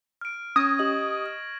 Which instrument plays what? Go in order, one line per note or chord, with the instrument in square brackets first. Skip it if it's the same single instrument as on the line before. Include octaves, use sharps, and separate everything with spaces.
[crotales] F6 D7
[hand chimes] C#4 [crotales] C#6 G#6 A#6 [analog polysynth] D#6
[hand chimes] G4 D#5 [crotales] F#7
[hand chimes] F6